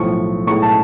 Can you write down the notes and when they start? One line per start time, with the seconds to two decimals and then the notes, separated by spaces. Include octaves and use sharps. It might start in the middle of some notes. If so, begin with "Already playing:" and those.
Already playing: B1 A2 F3 C#6
0.47 B1 A2 G#3 C#6
0.62 A5